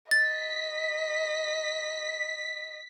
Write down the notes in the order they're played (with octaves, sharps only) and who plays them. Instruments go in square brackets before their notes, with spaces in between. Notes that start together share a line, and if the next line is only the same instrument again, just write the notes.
[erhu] D#5 [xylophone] A6 [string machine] B6